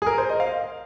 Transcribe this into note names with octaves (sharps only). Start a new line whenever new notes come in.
G#4
A#4
C5
D#5
F5